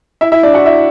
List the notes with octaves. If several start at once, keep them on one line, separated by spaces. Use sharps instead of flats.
E4 E5
E4 E5
D4 D5
F#4 F#5
E4 E5